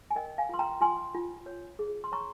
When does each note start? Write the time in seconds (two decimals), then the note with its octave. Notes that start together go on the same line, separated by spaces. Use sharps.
0.11 G#5
0.16 A#4 D#5 G5
0.38 F5 G#5
0.49 F4 C6
0.59 G5 A#5
0.81 F4 G#5 C6
1.15 F4
1.46 C#5
1.79 G#4
2.04 C6
2.12 C#5 A#5 C#6